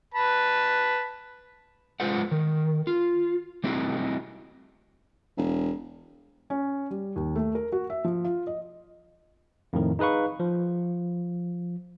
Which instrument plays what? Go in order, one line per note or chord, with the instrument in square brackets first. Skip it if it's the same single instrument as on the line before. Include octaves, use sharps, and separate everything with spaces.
[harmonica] B4 A5 B5
[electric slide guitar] G#3 F4 B4 C5 F#5
D#3
F4
G3 C4 D#4 E4 F#4
[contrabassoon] E1
[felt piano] C#4
G3
D#2
A3
A#4
F#4
E5
F3
F4
D#5
[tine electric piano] F2 A2 D#3
D#4 G#4 B4 F5 C#6
F3